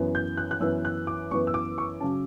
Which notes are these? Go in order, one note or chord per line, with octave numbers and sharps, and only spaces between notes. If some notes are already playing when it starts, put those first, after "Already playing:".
Already playing: F#2 E3 B3
G6
F#6
F#6
F#2 E3 B3 E6
F#6
D6
F#2 E3 B3 C#6
E6
D6
C#6
C#3 F#3 C#4 A5